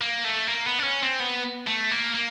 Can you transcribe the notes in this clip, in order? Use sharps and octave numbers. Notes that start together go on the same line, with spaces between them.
A#3
A3
A#3
B3
D4
C#4
C4
B3
A3
A#3
A#3